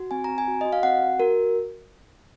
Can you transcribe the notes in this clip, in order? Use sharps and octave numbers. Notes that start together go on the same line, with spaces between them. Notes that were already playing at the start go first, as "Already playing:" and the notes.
Already playing: F#4
C4 G#5
C4 A#5
G#5
F#4
F#4 D#5
F5
C4 F#5
F#4
F#4 A#4